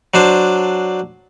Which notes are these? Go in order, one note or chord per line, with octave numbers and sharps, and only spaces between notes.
F#3 D4 C5